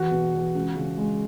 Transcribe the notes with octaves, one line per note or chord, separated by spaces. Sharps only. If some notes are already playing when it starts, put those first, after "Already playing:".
Already playing: E2 F#4
B2
E2
C#2
C#3
G#3